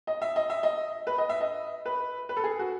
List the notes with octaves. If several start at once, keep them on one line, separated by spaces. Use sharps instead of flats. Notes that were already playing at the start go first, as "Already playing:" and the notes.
D#5
E5
D#5
E5
D#5
B4
D#5
E5
D#5
B4
B4
A4
G#4
F#4